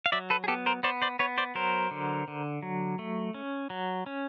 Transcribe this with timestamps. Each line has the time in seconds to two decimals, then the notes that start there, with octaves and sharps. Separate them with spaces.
0.06 F5
0.12 F#3 D5 E5
0.30 A4 B4
0.44 G#4
0.48 B3 G4 A4
0.66 A#4 C5
0.83 B3 C5 D5
1.02 C5 D5
1.19 B3 B4 C#5
1.38 C5 D5
1.55 F#3 A#4 C5
1.91 D3
2.28 D3
2.62 F#3
2.99 A3
3.34 C#4
3.70 F#3
4.06 C#4